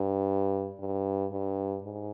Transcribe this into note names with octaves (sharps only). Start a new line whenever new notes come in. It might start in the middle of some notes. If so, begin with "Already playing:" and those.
Already playing: G2
G2
G2
G#2